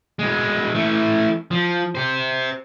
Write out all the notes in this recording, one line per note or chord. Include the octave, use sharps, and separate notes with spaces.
B2 G#3
E3 A3
F3
G4 C5